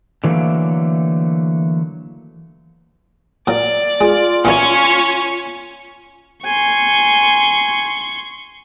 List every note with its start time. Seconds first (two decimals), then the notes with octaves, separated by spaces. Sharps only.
0.24 D3 E3 F#3 A3 A#3
3.47 A#2 F#3 D5
4.01 G#3 F4
4.45 A#2 E3 F#3 C#4 C#5
6.45 G#5 C6 C#6